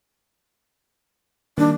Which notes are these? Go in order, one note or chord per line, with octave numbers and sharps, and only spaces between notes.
D#3 G3 A#3 D4